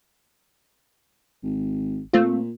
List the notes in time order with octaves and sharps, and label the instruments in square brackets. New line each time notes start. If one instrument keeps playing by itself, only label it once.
[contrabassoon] G#1
[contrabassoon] A#2 [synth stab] A3 C4 F4